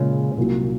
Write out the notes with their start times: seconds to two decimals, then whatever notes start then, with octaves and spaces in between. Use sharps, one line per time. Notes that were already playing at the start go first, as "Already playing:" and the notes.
Already playing: A#2 C#3 G#3 C#4
0.37 C2 A#2 F#3 A#3